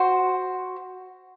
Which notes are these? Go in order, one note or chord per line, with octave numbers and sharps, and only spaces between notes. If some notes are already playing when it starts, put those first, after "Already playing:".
Already playing: F#4 C5